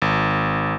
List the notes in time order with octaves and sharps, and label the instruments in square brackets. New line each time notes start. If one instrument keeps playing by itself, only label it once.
[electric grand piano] G#1